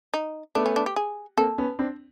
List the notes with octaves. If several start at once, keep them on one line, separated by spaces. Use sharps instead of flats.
D#4
A3 B3 D4
C#4
D4
G4
G#4
A#3 C4 A4
B3 C#4
C4 D4